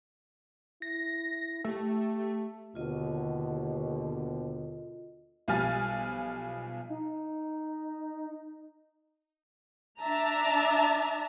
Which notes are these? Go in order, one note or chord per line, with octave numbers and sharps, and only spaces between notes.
E4 A#6
A3 G4
D#2 B2 D3 F4 D#5
B1 F3 G3 G#5 F6 A6
D#4
D4 E5 A5 A#5